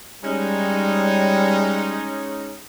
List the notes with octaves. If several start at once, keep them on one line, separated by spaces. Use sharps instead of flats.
G3 G#3 C#4 D#4